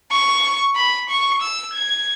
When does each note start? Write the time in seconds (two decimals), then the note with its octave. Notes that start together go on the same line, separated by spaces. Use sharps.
0.11 C#6
0.76 B5
1.09 C#6
1.42 E6
1.74 G#6